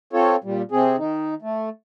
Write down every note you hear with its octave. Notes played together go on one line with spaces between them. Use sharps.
C4 F4 A4 C#5
A#2 G3
C3 C4 G#4
D#3 D#4
A3